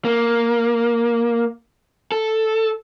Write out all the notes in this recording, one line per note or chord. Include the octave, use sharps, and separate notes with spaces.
A#3
A4